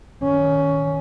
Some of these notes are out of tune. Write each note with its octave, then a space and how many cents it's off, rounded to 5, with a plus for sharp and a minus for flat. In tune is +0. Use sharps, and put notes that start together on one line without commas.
D#3 +0 C#4 +15